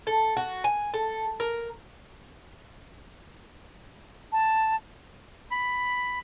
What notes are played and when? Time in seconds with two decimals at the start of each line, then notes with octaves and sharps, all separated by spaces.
0.07 A4
0.37 F#4
0.64 G#5
0.94 A4
1.40 A#4
4.32 A5
5.51 B5